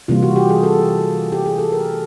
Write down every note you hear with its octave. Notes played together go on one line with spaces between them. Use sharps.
C3 E3 G3 A#3 F4
F#4
G4
G#4
A4
G4
G#4
A4
A#4